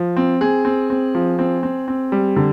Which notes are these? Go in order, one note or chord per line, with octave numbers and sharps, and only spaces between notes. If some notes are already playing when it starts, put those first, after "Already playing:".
Already playing: F3
C4
C4 G#4
C4
C4
F3
C4
C4
C4
G3
D3